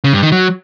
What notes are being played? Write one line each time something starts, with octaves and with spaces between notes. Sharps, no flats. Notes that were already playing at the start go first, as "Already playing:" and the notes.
C#3
G2
D#3
F#3